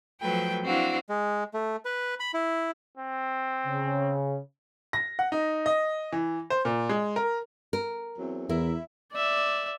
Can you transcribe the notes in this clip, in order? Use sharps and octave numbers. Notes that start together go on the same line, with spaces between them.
F3 F#3 A3 B4 G5
C4 D4 E4 F#4 F5
G#3
A3
B4
B5
E4
C4
C#3
A#6
F#5
D#4
D#5
E3
C5
A#2
G#3
A#4
A#4
E2 F#3 C4
E2 E4 A#4
D5 E5